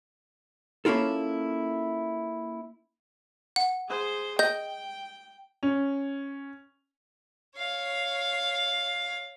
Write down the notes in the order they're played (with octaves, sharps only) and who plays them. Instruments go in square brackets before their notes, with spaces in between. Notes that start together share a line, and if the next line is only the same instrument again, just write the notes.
[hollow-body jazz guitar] A#3 C#4 E4 F4 A4
[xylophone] F#5
[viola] G#4 C5
[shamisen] D#5 [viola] G5 [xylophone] G6
[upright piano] C#4
[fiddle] C#5 F5